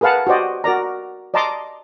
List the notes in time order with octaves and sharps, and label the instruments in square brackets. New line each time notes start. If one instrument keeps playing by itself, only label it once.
[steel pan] G#4 A#4 B4 F5 F#5 A5
F#4 G4 C5 D5 D#5
F#4 A#4 D5 A#5
D5 D#5 A5 A#5 C6 D6